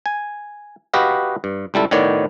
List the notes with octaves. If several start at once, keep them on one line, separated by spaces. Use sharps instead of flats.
G#5
F#4 G4 B4 D#5 F5
G2
C#2 G3 E4 A4
A2 D#3 B3 C#5 D5